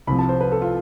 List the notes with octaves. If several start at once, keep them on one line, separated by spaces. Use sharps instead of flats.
C2 C3 F3 B5
A5
C5
B4
A4
F4